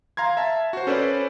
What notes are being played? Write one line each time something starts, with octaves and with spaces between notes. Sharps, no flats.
F5 A#5 C6 G#6
E5 A5
F#4 C5
C#4 A4 B4 C5 D5